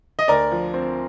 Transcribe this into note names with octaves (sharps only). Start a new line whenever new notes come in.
D#5
D2 A#4 D5
F3
C4